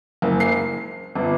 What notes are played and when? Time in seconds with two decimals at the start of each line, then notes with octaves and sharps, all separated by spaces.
0.22 F#1
0.40 C7
1.15 G1